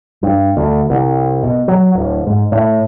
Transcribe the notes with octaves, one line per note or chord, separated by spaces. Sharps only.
G2
D2
C2
B2
F#3
D1
G#2
A2